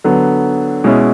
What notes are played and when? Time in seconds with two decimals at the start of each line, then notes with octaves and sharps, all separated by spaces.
0.04 D3 F#3 B3
0.84 B2 G#3 C#4 E4